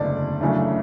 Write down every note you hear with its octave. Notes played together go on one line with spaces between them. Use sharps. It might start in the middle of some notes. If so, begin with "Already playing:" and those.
Already playing: F#1 E2 D3 A3 D4 D5
F#2 C#3 E3 A3 D4